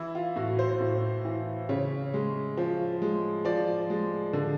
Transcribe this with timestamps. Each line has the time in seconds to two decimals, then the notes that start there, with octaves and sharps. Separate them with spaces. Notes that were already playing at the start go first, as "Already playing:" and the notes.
Already playing: E3 E4
0.15 F4
0.36 A2 F#4
0.59 C5
0.80 A2
1.25 E3
1.69 C#3 C#5
2.14 G#3
2.57 F3
3.02 G#3
3.45 F3 D5
3.90 G#3
4.33 D3